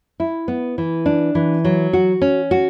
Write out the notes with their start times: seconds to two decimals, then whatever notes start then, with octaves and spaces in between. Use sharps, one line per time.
0.20 E4
0.48 B3
0.78 E3
1.06 D4
1.35 E3
1.65 F#3
1.93 F#4
2.22 C#4
2.51 F#4